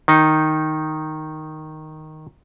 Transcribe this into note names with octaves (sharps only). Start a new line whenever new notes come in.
D#3 D#4